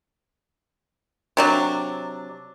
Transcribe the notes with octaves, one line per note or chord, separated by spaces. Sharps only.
C3 F#3 D4